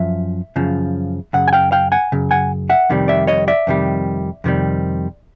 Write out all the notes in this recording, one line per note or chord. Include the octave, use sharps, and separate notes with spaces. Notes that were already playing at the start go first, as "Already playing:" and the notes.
Already playing: F#2 F3 E5
F#2 C#3 F3
F#2 C#3 F#5
G#5
F5 G5
F5 G5
F#5 G#5
F#2 C#3
F#5 G#5
E5 F#5
F2 C3 D#3 G3
D5 E5
C#5 D#5
D5 E5
F2 C3 D#3 G3
F2 C3 D#3 G3